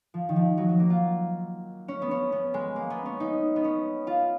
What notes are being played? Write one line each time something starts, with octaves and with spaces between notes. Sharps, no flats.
F3
D#3
F3
F#3
F#3
A#3
F4
C#4
B3
C#4
B3
G#3
A#3
B3
C#4
D#4
B3
C#4
F4